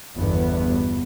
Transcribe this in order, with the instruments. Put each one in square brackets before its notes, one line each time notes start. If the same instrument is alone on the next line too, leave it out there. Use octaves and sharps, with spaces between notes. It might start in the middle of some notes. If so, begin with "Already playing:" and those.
[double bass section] G1 E2 G2 B3